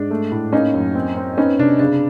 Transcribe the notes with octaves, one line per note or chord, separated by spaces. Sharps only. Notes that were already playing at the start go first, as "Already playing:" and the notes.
Already playing: G#2 D4
A3
A2
A#3 C#4 D#4
F#2
C4
C4
B3 C#4 D#4
C3 D4
C#3 D4